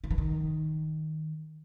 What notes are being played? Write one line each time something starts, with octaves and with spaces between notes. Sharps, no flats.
D#3
E3
D#3